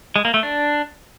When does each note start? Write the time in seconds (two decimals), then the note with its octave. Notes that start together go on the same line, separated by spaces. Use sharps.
0.16 G#3
0.25 A#3
0.34 A3
0.43 D4